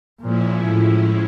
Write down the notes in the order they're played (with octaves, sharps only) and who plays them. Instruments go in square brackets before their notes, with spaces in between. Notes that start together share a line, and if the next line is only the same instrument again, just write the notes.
[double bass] A#2 [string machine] F3 G#3 C#4 E4
[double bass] A2